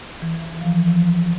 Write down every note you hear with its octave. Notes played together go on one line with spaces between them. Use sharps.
E3
F3